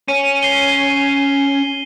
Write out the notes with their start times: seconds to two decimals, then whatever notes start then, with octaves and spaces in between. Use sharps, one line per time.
0.08 C#4 D#7
0.43 C7 G7